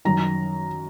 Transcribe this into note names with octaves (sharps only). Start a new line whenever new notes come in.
F#2 D#3 A#5